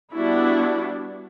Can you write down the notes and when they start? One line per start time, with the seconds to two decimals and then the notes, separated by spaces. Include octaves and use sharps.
0.13 G3 B3 D4 E4 F#4